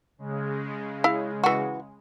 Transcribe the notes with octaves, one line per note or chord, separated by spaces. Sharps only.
C#3 G#3
E4 F5
E3 F#4